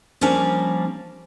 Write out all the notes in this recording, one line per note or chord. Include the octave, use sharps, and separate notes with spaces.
F3 G3 A#3 C#4 D4